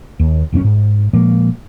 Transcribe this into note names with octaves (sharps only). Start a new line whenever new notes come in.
D#2
E1 F#2 B3 C#4
G#2
A#2 F3 G#3 A#3